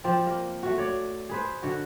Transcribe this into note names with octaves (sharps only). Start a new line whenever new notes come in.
F3 C4 D5 G5
A#3 A#4
A3 F#4
C#5 D5
G#4 B4 C5
D3 F#4